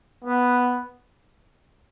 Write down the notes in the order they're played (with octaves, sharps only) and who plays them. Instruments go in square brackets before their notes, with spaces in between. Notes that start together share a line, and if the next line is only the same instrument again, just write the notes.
[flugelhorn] B3